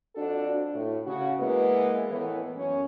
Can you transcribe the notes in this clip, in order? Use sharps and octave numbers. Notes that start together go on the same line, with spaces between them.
F2 D4 F#4 A4
A2
C#3 F#4
E3 G#3 A#3 B3
A2 E3 B3
F#2 C#4